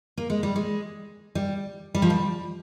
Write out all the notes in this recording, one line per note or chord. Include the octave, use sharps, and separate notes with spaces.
A#3
G#3
G3
G#3
G3
G3
F3
G3